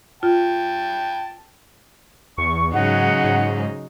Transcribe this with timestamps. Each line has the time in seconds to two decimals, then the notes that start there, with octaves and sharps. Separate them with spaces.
0.23 F4 G5 A5
2.38 E2 C#6
2.74 G#2 C#3 F#3 D#4 F#5
3.24 G#2